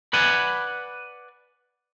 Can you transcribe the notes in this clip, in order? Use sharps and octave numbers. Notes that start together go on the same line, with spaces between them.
B4 D5 F#5 G#5